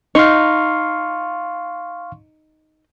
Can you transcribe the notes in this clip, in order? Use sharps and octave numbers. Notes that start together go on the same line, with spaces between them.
D#4 F5 C6 C#6